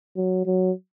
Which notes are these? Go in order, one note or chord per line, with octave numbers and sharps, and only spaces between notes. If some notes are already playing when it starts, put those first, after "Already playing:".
F#3
F#3